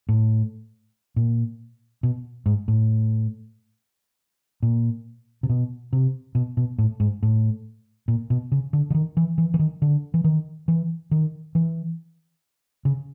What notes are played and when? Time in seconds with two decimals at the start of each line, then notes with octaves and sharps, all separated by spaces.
0.09 A2
1.16 A#2
2.03 B2
2.46 G#2
2.68 A2
4.63 A#2
5.43 C3
5.50 B2
5.93 C3
6.35 B2
6.57 B2
6.78 A2
7.00 G#2
7.23 A2
8.08 A#2
8.30 B2
8.52 C#3
8.73 D3
8.90 D3
8.94 D#3
9.17 E3
9.38 E3
9.54 E3
9.59 D#3
9.82 D3
10.14 E3
10.24 D#3
10.68 E3
11.11 D#3
11.55 E3
12.85 C#3